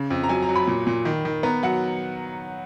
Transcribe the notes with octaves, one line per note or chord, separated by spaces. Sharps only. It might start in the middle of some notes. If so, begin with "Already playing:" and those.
Already playing: C#3
F2
A#5
F#3 G#5
A#5
F#3
B5
A#2
A#2
D#3
D#3
B3 A#5
F#3 F#5